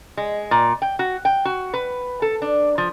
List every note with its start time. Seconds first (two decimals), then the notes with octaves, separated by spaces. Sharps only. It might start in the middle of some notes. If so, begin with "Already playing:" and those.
0.17 G#3
0.51 A#2
0.82 G5
0.99 F#4
1.25 G5
1.45 F#4
1.74 B4
2.22 A4
2.42 D4
2.78 F3